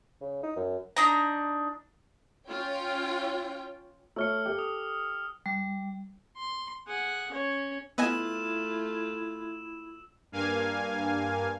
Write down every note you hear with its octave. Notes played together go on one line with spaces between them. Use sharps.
C#3
D#4
F#2
D4 D#4 A#5
C#4 F4 C#5 G5
A3 C#5 E6 F6 C#7
G4 A4
D#6
G3
C6
G#4 F#5
C#4 C#5
A3 B3 E4 F4 D#5 G#5 E6 E7
G2 A#3 F5 G#5